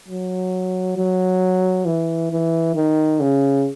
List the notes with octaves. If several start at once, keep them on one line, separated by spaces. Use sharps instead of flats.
F#3
F#3
E3
E3
D#3
C#3